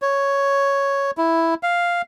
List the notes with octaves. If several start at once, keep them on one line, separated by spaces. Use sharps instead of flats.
C#5
E4
F5